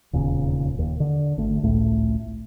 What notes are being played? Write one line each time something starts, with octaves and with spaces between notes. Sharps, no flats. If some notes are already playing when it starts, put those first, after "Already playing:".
E1 D#2 A#2 C#3
D#2
D3
G#1 D3 A3
G#1 C#2 A2 A3